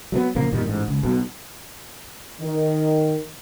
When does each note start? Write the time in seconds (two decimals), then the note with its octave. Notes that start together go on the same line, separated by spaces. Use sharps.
0.12 F#3 G#3 B3
0.35 A#1 C#3 F3 A#3
0.52 F#2 A#2 D#3 G3
0.64 A1 G#2
0.88 C#2
1.03 B1 B2
2.40 D#3